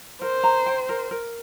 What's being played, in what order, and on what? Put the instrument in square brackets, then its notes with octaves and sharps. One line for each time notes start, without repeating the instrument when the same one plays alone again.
[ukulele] A#4 [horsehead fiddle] C5
[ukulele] A#5
G5
A#4
A#4